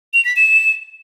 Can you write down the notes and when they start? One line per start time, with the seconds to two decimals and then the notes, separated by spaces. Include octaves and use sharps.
0.14 F7
0.25 B6
0.36 E7